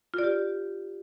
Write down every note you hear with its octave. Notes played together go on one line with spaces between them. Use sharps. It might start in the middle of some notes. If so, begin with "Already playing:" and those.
F4 G4 D5